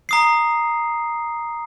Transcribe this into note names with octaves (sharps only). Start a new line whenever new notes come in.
A#5 D#6 C7